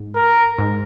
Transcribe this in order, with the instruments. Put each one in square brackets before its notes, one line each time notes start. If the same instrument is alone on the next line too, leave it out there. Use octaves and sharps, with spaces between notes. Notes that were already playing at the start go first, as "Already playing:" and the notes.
Already playing: [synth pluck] G#2
[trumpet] A#4
[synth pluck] G#2